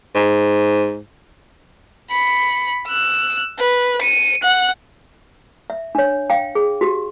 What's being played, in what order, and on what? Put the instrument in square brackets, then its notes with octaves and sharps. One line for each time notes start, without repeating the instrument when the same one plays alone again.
[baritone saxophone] G#2
[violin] B5 C#7
E6 F#6
B4
C#7 D#7
F#5 F#6
[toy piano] E5
D4 C#5
F5 G5
G#4
F#4 G4